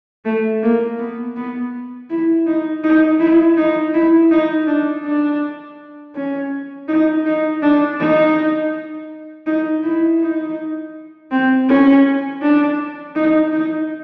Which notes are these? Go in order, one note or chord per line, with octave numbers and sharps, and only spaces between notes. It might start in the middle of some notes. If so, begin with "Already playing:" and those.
A3
A#3
B3
B3
E4
D#4
D#4
E4
D#4
E4
D#4
D4
D4
C#4
D#4
D#4
D4
D#4
D#4
E4
D#4
C4
C#4
D4
D#4
D#4